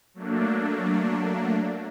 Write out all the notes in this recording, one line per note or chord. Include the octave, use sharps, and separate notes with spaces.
F#3 A3 A#3 D4